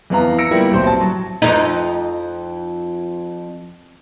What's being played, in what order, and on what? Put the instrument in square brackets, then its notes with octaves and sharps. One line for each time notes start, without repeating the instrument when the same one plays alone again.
[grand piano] F2 E3 B3 F5 A#5
E6 A#6 C#7 D7
G3 A#3 B3 E4 F4
D#1 B1 A2 C4 C5 C6
A5
F#3
[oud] F2 D#4